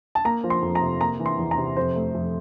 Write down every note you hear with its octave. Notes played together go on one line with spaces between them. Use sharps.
A5
A#3 A#5
F3
C6
F2
A#5
C3
A#3 A#5
E3
C6
E2
A#5
C3
F2 C5
A3
F2